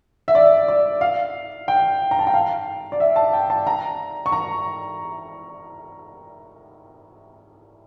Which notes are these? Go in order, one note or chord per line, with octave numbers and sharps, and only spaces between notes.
E5
D5
D5
F5
G5
A#5
A5
G5
F5
D5
E5
A5
G5
A5
A#5
C#6
A#5